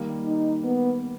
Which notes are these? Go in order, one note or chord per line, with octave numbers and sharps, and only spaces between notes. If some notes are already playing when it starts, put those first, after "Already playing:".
Already playing: D#3 G3 A#3
D#4
B3